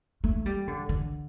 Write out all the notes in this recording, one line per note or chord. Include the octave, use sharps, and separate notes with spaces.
A3
G3
D3
D3